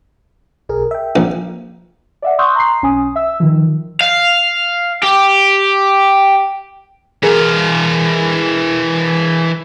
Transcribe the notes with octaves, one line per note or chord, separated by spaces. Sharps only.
B1 G#4 A#4
E5 G5
A#1
D5 E5 F#5
C6 C#6 D#6 E6 F#6 G6
A#5 C6 C7
B1 C#4 G#5 D#6
E5 E6
D#3 F3
F5
G4
E3 G#4 A#4 F5